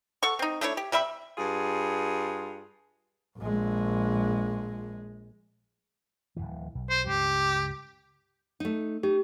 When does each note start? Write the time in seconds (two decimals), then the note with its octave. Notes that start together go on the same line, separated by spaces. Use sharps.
0.23 A4 F#5 C#6
0.39 C4 D#4
0.61 A3 D4 E4 C#5
0.77 G4
0.92 C3 G3 E5 B5
1.38 G2 F4 G#4
3.38 A#1 G#3
6.36 D1 B1 E3
6.75 B1
6.90 C5
7.07 C#2 G2 C#3 G4
8.60 A3 D#4
9.03 D#4 G4